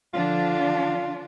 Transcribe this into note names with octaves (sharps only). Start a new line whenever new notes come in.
D3 F3 D4 F4